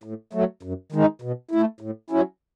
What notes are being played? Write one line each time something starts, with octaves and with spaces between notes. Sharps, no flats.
A2
F#3 A3
F#2
D#3 G#3 D#4
B2
A3 E4
A2
F#3 C#4 E4